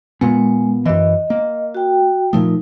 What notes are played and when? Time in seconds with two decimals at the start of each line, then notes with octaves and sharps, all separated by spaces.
0.21 A#2 G#3 B3
0.86 F#2 E3 D#5
1.30 A#3
1.75 F#4 G5
2.33 A#2 F3 A3 D#4